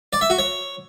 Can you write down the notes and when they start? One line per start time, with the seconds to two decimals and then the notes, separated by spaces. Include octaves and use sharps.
0.13 D5
0.21 E5
0.30 F#4
0.38 C#5